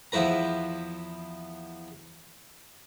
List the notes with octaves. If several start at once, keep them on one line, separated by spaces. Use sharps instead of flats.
E2 F3 E4 B4 A#5